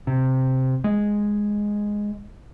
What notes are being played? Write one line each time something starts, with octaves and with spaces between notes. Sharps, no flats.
C3
G#3